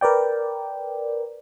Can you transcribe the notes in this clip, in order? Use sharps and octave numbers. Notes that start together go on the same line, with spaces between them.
A#4 B4 D5 G5